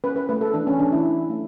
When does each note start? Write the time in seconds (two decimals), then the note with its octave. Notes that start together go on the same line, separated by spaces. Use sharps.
0.04 C#4 B4
0.16 B4
0.29 A3 B4
0.41 A4
0.54 E3 D4
0.67 C#4
0.79 E3 D4
0.92 E4
1.05 A3
1.30 A3